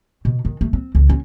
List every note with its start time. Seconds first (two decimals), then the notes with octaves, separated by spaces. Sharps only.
0.25 B2
0.45 D#3
0.61 A3
0.73 C4
0.95 C#2
1.09 C#4